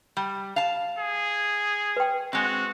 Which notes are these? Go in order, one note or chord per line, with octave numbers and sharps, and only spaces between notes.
G3
F5 A5
G#4
B4 G5
G#3 C4 F#4